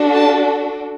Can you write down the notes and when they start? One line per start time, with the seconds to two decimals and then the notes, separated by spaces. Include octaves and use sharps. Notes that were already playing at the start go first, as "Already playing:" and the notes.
Already playing: D4 F#4 A4
0.14 A5